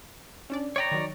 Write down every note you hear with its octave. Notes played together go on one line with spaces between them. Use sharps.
C#4 D4 D5
C#5 D5 G5 A#5 B5 D6
D#3 F#3